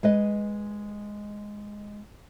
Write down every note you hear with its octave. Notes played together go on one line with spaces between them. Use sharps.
G#3 B4 D#5